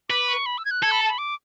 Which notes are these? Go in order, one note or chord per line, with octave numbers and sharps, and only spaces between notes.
B4 D6
C#6
B5
E6
G#6
F#6
A4 G#6
B5
A5
B5
D6